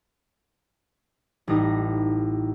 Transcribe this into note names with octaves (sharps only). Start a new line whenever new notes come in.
A1 G3 D#4 D#5